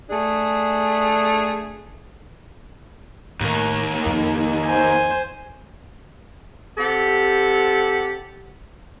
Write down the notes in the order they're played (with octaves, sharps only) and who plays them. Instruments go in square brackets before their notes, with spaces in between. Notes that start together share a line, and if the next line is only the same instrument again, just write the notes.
[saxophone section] A3 D4 G#4
[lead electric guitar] D#2 A#3 [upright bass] A2
[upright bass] F2 [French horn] D#4
[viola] C5 G#5
[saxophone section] C3 G4 A4 F#5